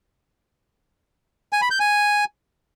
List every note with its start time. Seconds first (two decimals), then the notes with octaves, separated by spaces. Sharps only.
1.53 G#5
1.62 B5
1.71 G6
1.80 G#5